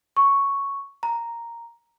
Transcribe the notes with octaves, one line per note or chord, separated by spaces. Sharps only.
C#6
A#5